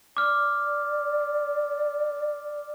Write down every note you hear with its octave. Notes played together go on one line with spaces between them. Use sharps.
D5 D6 F6